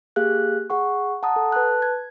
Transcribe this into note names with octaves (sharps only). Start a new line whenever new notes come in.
A#3 G4 G#4 F5 F#6
G#4 F#5 C#6
F#5 A5 A#5 D#6
A4
B4 A5 F#6
G#6